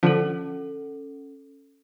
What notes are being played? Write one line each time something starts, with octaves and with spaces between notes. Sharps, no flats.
D3 F3 C#4 A4